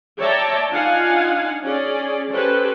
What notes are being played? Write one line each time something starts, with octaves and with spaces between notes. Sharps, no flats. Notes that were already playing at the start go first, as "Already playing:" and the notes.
C#5 D5 E5 G5 A5 A#5
D4 D#4 F4 F5 F#5 G#5
C#4 G#4 D5
C#4 G4 A4 B4 C5